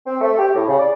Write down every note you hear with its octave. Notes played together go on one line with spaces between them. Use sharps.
C4
A3
G4
A2
C#3
D5